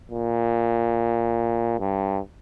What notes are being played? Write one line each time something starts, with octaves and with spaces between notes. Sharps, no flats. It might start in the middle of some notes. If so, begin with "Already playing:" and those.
A#2
G2